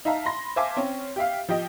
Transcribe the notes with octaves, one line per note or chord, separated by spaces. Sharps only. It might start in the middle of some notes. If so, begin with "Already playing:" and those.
D#4 E5 F5 A5 A#5
B5 C6 A#6
C5 E5 F5 G#5 A5 D6
C4 C#4 C#5
G4 E5 F5
F3 G4 D#5